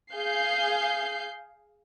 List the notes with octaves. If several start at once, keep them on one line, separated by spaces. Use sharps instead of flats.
G#4 F5 G6 C7